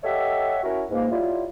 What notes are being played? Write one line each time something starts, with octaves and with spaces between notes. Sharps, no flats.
G4 A4 C#5 D#5 E5 F#5
C#4 E4 F#4 A#4
C#2 G#2 A#3
F#3 G3 E4 F4